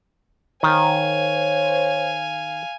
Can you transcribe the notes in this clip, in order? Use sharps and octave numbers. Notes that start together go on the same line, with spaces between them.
D#3 C5 C#5 F5 G#5